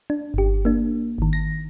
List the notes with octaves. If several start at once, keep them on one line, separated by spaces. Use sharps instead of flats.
D4
G1 G4
A#3 D4
G#1 D#3
A#6